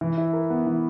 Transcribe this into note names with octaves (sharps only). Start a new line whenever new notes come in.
E3
E4
A#4
B3
E3